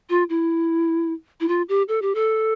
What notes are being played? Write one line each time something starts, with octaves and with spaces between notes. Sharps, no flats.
F4
E4
E4
F4
G4
A4
G4
A4